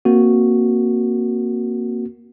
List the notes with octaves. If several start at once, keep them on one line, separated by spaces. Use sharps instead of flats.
A#3 C4 F#4